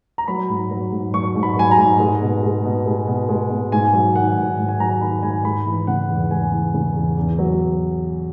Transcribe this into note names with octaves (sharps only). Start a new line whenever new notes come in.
A#5
F#3 B5
G#2
F#3
G#2
F#3 C#6
G#2
B5
F#3 G#5
A#5
G#2
G#3
B2
G#3
B2
G#3
B2
G#3
B2
G#2 G#5
F#3
D#3 F#5
G#2
G#2
G#5
F#3 A#5
D#3 B5
G#2 G#5
G#3 B5
E3
C#3 F#5
E2
G#3 G#5
E3
C#3
E2
E2
F#3